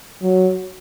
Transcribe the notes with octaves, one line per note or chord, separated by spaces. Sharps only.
F#3